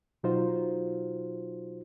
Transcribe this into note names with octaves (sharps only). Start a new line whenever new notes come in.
B2 F#3 D#4 F4 F#4 C5